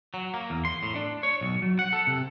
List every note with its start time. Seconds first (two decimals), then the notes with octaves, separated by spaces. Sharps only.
0.14 F#3
0.34 A#3
0.50 E2
0.65 C6
0.83 A2
0.96 D4
1.23 C#5
1.41 B1
1.62 F#3
1.79 F#5
1.93 A4
2.07 C3